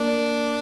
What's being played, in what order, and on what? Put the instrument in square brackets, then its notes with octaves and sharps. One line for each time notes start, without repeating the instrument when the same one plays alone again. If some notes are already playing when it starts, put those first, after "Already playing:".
Already playing: [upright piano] A#3 [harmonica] D4